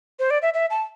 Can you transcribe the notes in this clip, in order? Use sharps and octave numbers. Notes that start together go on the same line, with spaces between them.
C5
D5
E5
E5
A5